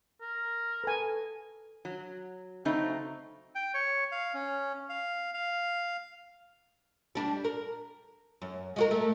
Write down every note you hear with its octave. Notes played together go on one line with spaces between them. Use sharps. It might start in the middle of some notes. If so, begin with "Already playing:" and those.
A#4
A4 B4 G#5
F#3
C#3 F#3 A3 C4 D#4
G5
C#5
F5
C#4
F5
F5
G3 D4
A#4
F#2
G#3 F#4 A#4
A3